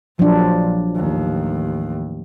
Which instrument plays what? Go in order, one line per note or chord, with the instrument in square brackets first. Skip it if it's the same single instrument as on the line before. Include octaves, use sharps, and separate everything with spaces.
[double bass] A#1 [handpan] F3 F#3 D4
[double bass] A1 D#2